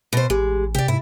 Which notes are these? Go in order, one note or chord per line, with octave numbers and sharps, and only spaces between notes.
B2 C5
A1 G#3 G4
C3 G4 D5
G#2 E4